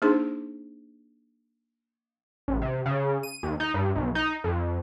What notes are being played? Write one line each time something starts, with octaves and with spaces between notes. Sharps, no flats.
A#3 D4 D#4 G#4 C5 C6
A1
C3
C#3
D#7
D#2
D#4
G2
B1
D#4
F2